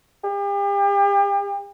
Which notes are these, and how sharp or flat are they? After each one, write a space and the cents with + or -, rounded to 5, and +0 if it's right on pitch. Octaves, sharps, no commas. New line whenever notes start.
G4 +40